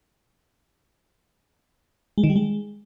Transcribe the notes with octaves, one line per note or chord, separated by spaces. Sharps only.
G#3
D#3
G3
G#3